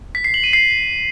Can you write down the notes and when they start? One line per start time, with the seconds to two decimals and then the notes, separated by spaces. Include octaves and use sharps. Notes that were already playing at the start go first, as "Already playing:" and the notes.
0.15 B6
0.24 C7
0.34 F#7
0.44 D#7
0.53 C7